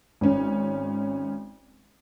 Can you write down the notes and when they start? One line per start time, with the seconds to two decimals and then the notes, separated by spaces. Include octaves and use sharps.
0.21 G#1 C#4